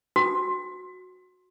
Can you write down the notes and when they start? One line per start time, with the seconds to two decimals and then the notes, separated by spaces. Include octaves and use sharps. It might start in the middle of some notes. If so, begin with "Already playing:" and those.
0.16 F#4